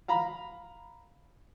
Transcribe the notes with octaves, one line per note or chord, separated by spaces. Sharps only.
F5 A#5 B5